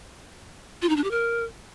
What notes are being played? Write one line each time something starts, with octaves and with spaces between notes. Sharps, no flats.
F4
D#4
D4
G4
A#4